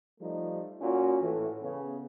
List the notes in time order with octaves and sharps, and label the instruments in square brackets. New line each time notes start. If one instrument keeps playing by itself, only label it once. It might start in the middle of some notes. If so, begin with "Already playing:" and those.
[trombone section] F3 G3 A3 D#4
A#2 C#4 F4 F#4
A2 E3
C#3 B3